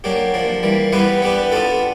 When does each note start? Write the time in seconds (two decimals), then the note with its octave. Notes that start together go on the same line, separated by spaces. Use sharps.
0.04 F#3 A#3 D4 G4
0.34 F3 A#3 D4
0.63 E3 G3 A#3
0.92 G3 B3 E4 G4 B4
1.22 B3 D4 G4 B4
1.52 B3 D4 F4 A4